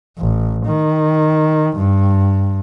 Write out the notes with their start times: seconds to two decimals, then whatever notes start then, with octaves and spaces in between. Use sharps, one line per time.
0.19 A1
0.65 D#3
1.77 G2